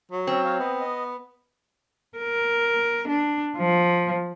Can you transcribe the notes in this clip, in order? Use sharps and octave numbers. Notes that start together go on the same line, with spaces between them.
F#3
C4 C#4 C#5
C#5 F5
B3 D#5
D#5
A#4
D4
F3